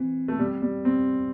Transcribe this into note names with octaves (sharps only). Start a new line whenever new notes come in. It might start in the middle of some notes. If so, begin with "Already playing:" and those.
Already playing: E3 C4
A3
G3
G3
C4